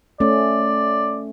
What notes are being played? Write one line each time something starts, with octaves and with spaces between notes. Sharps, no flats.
A3 C#4 D5